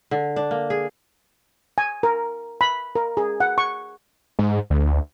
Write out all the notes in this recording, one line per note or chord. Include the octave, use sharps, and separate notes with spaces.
D3
D4
A#3
G#4
G#5
A#4
B5
A#4
G#4
F#5
C#6
G#2
D2